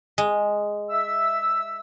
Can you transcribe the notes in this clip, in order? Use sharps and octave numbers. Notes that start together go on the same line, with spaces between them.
G#3
E5 E6